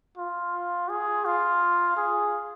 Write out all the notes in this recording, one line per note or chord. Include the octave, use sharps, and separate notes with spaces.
F4
G#4
F4
G#4